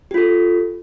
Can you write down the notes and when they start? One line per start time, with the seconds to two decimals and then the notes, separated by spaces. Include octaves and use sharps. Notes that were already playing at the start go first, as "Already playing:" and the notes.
0.11 G4
0.14 F4
0.18 A4